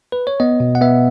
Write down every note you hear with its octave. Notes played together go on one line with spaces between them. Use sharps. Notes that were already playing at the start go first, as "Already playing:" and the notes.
B4
C#5
B3 D#5
B2
F#5
B3 E5